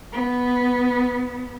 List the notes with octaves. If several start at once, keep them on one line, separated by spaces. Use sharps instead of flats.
B3